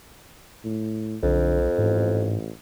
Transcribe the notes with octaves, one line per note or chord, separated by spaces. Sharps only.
A2
B1 F2 D3
A1 G#2